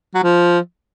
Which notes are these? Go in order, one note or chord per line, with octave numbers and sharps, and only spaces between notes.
F#3
F3